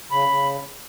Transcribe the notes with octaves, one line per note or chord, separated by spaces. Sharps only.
C#3 B5
C#3